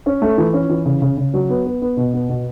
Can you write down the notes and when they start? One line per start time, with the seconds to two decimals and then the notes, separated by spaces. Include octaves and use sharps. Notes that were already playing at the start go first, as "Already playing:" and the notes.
0.06 C#4
0.22 A3
0.38 E3
0.53 C#4
0.69 E3
0.86 C#3
1.02 C#3
1.17 C#3
1.34 F#3
1.49 B3
1.66 B3
1.82 B3
1.97 B2
2.14 B3
2.29 B2